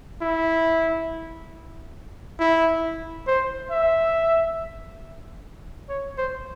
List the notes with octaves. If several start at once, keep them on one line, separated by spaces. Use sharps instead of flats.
E4
E4
C5
E5
C#5
C5